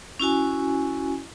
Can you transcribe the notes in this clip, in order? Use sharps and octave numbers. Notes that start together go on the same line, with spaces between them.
C#4 E4 F#4 G#5